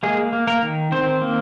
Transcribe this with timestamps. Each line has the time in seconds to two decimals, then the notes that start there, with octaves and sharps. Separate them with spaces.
0.03 G#3 A#3 G#4
0.33 A#3
0.47 A#3 A#4
0.62 D#3
0.92 D#3 C4 C5
1.21 A#3